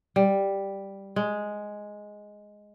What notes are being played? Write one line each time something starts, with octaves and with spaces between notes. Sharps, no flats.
G3
G#3